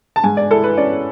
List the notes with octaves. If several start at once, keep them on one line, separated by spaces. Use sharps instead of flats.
A5
G#2 G#5
D5
E4 A4
B4
C#4 D5